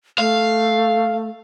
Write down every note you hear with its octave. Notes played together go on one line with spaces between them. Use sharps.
A3 F5